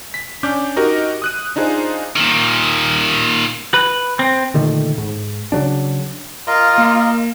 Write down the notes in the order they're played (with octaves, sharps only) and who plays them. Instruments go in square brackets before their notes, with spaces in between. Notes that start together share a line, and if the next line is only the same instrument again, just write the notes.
[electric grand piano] B6
C#4 D4 D6 G6
D#4 F#4 G4 A#4 D#5
D#6 F#6 D#7
D4 D#4 F4 G#4 C5
[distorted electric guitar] A#2 D#3
[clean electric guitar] B4
C4
[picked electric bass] A#2 D3 D#3 A3
G#2
C#3 F#3 D4
[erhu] F4 [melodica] A#4 D#5
[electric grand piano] A#3